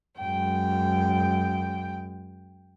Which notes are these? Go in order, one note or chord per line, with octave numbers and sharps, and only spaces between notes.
F#2 G#3 G5